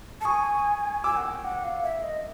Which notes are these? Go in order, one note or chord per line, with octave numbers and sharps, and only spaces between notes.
A5
G#5 C#6 D#6
G#5 D6 E6
F#5
G5
F#5
F5
E5
D#5